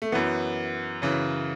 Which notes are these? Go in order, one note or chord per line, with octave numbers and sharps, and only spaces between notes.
A3
F#2 E3 B3
F#2 C#3 E3